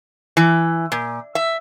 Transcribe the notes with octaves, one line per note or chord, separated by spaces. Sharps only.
E3
A#2
E5